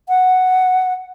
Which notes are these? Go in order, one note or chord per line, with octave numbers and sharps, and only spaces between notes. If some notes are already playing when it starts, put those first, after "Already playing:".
F#5